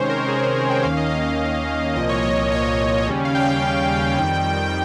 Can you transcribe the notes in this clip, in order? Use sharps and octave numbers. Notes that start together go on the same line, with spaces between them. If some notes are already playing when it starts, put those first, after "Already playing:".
Already playing: C3 D#3 G#3 C#4 C5 C#5
A#4
G#4
A#4
A#4
G5
D#2 D#3 A#3 C#4 F5
D#5
F5
C2 A#2 F3 A#3 D#5
C#5
D#5
C#5
D#2 C#3 G3 C#4
F5
G5
F2 D#3 G3
G5